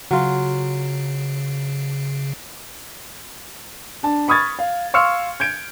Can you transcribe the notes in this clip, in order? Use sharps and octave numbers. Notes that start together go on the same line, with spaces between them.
C#3 F#3 F4
D4 A5
B5 C#6 D#6 F6 G#6 A6
F5
F5 C6 C#6 E6 F6 C#7
G6 G#6 D7